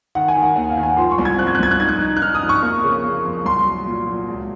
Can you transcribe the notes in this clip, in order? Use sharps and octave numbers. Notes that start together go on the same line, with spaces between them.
D#3 F#5
G#5
D#3
F#5
D#2
F5
D#3
G#5
F3 C6
C#6
C2
G#6
C4 F#6
G#6
F#6
C2 G#6
F#6
D#4 G#6
F#6
D#4
F#6
D#4 F6
D#6
F2
C#6
A#3
C#3
A#3
F2
C2 C6
F#3
A#2
F#3
C#2